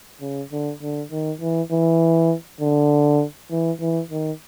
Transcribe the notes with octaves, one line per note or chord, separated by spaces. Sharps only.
C#3
D3
D3
D#3
E3
E3
D3
E3
E3
D#3